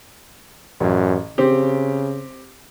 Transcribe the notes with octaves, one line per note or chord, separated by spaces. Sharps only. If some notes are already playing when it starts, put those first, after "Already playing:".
A1 F#2
C#3 C4 G4